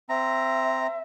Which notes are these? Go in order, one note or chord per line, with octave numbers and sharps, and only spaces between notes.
C4 E5 A#5